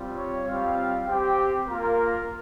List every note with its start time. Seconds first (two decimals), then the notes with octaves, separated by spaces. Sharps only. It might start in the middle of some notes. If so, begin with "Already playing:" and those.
Already playing: G3 C4 F4
0.16 C#5
0.47 G3 C4 F4 F5
1.07 C4 G4 G5
1.68 A#3 F4 A#4